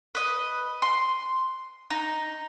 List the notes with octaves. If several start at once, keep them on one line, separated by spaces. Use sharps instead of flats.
B4 D#5
C6
D#4